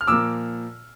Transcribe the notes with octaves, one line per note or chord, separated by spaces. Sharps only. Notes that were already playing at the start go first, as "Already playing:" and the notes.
F6
A#2 F3 A#3 D6 E6